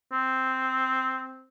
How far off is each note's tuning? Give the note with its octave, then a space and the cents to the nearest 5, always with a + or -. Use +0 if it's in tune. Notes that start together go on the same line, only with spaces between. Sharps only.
C4 -5